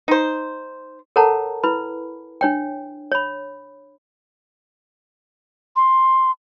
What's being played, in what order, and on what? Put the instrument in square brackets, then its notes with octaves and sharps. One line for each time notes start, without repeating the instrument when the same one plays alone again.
[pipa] D#4 C5
[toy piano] A4 A#4 C#5 F#5 A5 A#5
E4 B4 B5
D4 C#5 G5
C#5 B5
[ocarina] C6